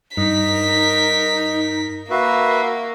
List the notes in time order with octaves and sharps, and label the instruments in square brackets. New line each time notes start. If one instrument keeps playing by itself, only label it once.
[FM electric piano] G2 [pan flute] D#4 [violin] A#4 B6 [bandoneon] D#5
[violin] A#3 [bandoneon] F#4 B4 E5 [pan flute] F5